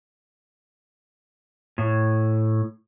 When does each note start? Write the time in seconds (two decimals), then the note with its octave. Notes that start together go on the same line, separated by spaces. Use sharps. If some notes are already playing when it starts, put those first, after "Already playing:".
1.78 A2